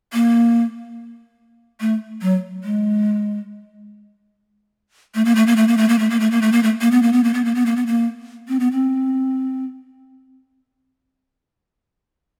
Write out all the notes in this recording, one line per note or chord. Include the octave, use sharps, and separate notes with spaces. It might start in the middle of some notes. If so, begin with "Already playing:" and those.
A#3
A3
F#3
G#3
A3
A#3
A3
A#3
A3
A#3
A3
A#3
A3
A#3
A3
A#3
A3
A#3
A3
A#3
B3
A#3
B3
A#3
B3
A#3
B3
A#3
B3
A#3
C4
B3
C4